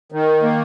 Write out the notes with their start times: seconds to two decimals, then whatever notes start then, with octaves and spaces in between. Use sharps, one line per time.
0.12 D#3
0.43 A#3